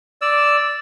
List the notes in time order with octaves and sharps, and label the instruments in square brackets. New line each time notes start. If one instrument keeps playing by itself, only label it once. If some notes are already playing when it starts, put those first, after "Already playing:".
[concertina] D5 E6